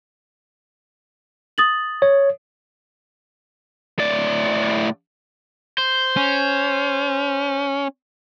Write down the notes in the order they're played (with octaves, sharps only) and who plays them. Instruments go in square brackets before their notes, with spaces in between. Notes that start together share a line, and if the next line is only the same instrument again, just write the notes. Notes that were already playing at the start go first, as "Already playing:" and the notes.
[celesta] D#6 A6 F#7
[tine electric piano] C#5
[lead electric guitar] A2 D5
[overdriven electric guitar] C5
[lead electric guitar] C#4